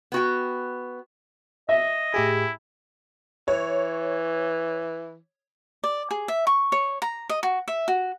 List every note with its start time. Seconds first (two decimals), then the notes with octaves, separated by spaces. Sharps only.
0.12 B3 F#4 G5
1.69 D#5 E5
2.14 A2 E4 G4 G#4
3.48 E3 C#5
5.84 D5
6.11 G#4
6.28 E5
6.47 C#6
6.72 C#5
7.02 A#5
7.29 D#5
7.43 F#4
7.68 E5
7.88 F#4